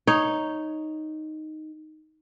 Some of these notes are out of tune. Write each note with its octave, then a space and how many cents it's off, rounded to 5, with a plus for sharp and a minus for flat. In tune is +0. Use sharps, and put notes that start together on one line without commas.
D#4 +0 C#5 +0